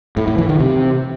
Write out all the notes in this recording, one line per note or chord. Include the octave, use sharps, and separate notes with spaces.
A2
A2
E3
D#3
C3